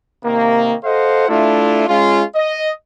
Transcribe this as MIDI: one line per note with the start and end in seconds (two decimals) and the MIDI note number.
0.25 0.75 48
0.25 0.75 51
0.25 0.75 58
0.84 1.27 69
0.84 1.27 72
0.84 1.27 75
0.84 1.27 77
0.84 1.27 78
1.29 1.84 57
1.29 1.84 62
1.29 1.84 64
1.29 1.84 65
1.88 2.23 56
1.88 2.23 61
1.88 2.23 65
2.36 2.70 75